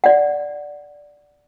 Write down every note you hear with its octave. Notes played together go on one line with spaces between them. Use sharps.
D5 F#5